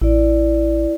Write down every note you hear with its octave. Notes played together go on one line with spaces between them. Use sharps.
A1 E4 D5